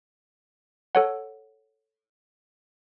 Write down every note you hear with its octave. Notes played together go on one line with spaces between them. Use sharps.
A4 C#5 F#5